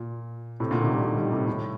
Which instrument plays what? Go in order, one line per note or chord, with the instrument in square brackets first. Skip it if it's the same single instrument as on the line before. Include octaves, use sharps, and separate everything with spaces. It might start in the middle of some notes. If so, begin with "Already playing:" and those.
Already playing: [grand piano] A#2
A2 C3
A#2 D3
C3 D#3
D#3 G3
D#3 G3
D#3 G3
A2 C3
A2